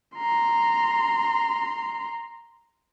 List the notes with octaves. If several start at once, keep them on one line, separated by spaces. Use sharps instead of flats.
A#5 C6